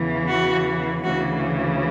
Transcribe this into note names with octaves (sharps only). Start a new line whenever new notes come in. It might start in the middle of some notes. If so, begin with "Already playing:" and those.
Already playing: E2 C#3 E3
F#4
D2 C#3 E3 F#4